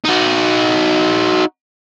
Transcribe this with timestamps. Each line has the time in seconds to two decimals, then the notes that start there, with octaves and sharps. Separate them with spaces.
0.05 D#4 F#4